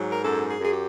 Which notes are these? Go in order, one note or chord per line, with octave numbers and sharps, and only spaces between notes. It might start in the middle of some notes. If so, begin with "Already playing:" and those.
Already playing: G#2 F#3
A#4
F#2 A4
G#4
F#2 G#4
G4